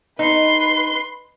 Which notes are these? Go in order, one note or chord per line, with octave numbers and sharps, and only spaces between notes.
D#4 B4 C6